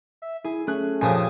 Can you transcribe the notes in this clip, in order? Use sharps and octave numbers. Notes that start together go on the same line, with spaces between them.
E5
E4 G#4
A3 C#4 G#4 F#6
F2 A#2 C#3 G4 G#5 A5 D#6